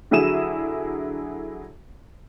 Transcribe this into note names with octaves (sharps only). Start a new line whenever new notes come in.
D3 F#3 E4 G#4 D#7 E7